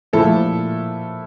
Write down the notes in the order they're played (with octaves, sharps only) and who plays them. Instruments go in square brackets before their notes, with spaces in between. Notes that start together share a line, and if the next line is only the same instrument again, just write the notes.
[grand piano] A#2 F3 A3 E4 A4